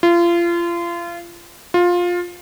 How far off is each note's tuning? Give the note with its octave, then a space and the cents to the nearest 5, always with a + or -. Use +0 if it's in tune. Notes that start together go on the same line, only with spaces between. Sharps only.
F4 -30
F4 +15